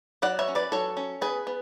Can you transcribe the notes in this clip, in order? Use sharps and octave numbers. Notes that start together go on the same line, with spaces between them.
F#3 D5 F#5
C#5 E5
C#4
B4 D5
F#3 A4 C#5
C#4
B3 G#4 B4
B3